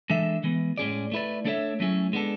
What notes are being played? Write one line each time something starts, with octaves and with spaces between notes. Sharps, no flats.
E3 G#3 D4 A4 E5
E3 G#3 B3
A2 G#3 C#4 G#4 D5
A3 E4 B4 D5
A3 D4 A4 C#5 E5
F#3 A3 C#4 E4 G#4
G#3 B3 D4 A4